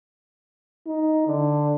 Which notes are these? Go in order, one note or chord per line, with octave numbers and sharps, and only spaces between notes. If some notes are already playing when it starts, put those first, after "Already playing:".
D#4
D3